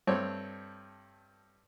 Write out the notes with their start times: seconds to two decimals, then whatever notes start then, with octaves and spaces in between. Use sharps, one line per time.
0.07 G2 A3 C4 C#5